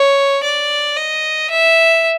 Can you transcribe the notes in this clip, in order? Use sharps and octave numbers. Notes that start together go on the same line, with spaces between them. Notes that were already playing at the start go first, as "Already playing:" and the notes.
Already playing: C#5
D5
D#5
E5